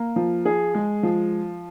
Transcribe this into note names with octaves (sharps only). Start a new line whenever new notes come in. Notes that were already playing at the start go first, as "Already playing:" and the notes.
Already playing: A#3
F3
G#4
G#3
F3